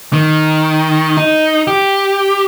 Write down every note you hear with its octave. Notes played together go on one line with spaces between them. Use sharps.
D#3
D#4
G4